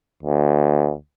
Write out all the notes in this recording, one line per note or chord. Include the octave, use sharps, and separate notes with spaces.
D2